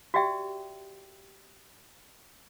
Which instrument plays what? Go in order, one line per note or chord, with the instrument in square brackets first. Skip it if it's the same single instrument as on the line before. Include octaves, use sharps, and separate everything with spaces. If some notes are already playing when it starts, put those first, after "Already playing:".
[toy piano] F#4 G4 D5 E5 G5